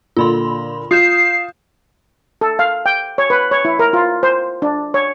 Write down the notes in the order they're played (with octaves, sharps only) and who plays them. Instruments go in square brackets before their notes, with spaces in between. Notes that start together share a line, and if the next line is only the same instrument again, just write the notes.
[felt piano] A#2 D3 [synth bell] F4 B5 C6
[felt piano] F4 [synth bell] D#6 G6 E7 [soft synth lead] C7
[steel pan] A4
F5
G5
C#5
B4
C#5
E4
A#4
F4
C5
D4
C#5